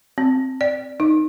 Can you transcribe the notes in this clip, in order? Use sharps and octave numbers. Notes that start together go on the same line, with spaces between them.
C4
D5
D#4